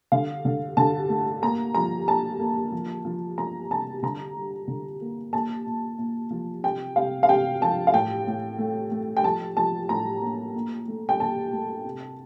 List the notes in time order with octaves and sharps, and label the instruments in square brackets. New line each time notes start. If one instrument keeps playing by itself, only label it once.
[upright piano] D3 F5
D3
D3 A5
A3
A#3 A#5
F3 A#5
A#2 A5
A#3
F3
F3
F3 A#5
C3 A5
D3 A#5
G3
D3
A#3
A#2 A5
A#2
A#2
F3
C3 G5
C3 F5
F5
C3 G5
F3 A5
F5
A2 G5
A2
A3
A3
G5
F3 A5
F3 A5
A2 A#5
A#3
A#2
A3
G5
A#2 A5
A3
C3